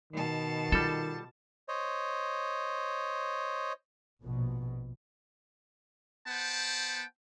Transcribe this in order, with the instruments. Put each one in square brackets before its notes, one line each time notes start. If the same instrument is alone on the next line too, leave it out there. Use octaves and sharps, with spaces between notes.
[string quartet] B2 A5 [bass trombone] D#3
[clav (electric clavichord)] G3 A4 [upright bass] F4
[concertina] C5 C#5 D#5
[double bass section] A#1 B2
[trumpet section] B3 C5 F#5 G5 A5